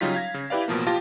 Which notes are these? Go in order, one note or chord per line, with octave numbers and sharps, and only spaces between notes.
C#3 F#3 G3 D#4 F4 B6
F5 G#6 A#6
C#3
E4 G4 B4 D5 F5
A1 B2 F3 A#3
F3 F4 G4 G5 A5 A#6